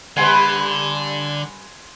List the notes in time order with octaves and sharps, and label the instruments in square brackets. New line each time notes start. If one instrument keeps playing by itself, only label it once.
[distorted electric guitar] D3 [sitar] G3 B4 [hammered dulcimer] G#5 C6